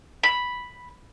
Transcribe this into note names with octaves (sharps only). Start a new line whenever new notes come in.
B5